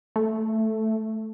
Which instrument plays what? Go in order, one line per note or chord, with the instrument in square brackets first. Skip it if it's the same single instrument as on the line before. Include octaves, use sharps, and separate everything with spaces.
[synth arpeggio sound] A3